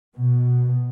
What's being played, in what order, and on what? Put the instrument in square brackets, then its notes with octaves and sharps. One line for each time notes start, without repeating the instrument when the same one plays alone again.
[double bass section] B2